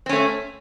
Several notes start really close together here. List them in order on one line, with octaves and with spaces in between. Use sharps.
C4 C#4 A3